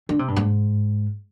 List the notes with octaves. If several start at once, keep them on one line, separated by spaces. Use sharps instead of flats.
D3
C3
G2
G#2